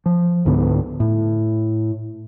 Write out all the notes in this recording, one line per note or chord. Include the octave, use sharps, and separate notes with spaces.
F3
C#2 G#2 D3 B3
A2